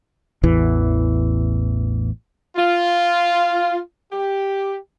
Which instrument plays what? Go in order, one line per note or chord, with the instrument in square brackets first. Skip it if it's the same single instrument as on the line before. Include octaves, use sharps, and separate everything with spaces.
[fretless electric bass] A1 E2 E3
[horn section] F4
G4